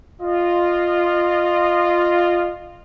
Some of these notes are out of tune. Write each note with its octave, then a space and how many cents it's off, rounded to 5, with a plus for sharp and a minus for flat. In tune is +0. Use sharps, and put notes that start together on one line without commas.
F4 +0 D#5 -25